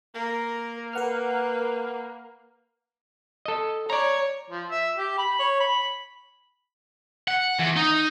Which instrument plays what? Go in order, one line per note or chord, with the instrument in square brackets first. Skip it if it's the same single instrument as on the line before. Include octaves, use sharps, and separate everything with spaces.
[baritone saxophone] A#3 [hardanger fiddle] A#4
[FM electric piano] A#4 F#5 F6 [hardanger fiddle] B4
[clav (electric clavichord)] A4 D#5
[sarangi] C#5 [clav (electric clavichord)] D5 A#5
[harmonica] F3
E5
G4
B5
C#5
B5
[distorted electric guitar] F#5
E2
D#4